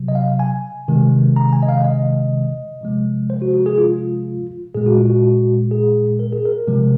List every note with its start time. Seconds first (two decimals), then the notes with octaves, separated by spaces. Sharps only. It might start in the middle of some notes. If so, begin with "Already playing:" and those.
Already playing: C3 F#3
0.08 D#5
0.15 F5
0.39 G#5
0.88 C3 D#3 G#3
1.36 A#5
1.52 G#5
1.63 D#5
1.69 F5
1.85 D#5
2.81 C3 F3 G#3
3.30 C5
3.42 F#4
3.54 F#4
3.66 G#4
3.78 F4
4.75 A#2 G#3 G#4
4.86 F#4
4.98 F4
5.10 F#4
5.71 G#4
6.19 A#4
6.32 G#4
6.45 A#4
6.68 C3 F3 G#3